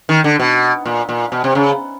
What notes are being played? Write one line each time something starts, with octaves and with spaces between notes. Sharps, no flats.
D#3
D3
B2
A#2
A#2
B2
C3
C#3